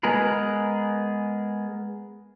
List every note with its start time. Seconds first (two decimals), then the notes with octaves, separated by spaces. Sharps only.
0.03 G#3 B3 G#4 A#4 B4